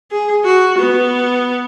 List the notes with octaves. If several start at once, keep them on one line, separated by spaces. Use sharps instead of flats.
G#4
F#4
B3